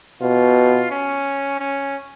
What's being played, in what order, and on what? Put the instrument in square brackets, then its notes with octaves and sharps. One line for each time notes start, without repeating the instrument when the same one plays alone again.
[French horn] B2 [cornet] F4
[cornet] C#4
C#4